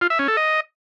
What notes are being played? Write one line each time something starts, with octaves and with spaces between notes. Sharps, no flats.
F4
E5
C#4
A4
D#5